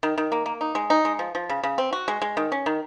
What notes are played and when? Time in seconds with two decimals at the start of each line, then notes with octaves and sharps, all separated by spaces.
0.03 D#3
0.18 D#3
0.32 A#3
0.46 A#3
0.61 D#4
0.75 G#3
0.90 D#4
1.05 G#3
1.19 F3
1.35 F3
1.49 C#3
1.63 C#3
1.78 C4
1.93 F#4
2.08 G#3
2.22 G#3
2.37 D#3
2.52 C#4
2.66 D#3